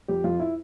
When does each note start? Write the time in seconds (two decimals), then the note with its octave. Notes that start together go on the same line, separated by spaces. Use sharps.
0.08 F2 G4
0.24 F2 F4
0.40 E4